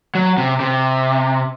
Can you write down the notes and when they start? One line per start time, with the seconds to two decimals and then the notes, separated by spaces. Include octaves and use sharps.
0.15 F#3
0.37 C3
0.60 C3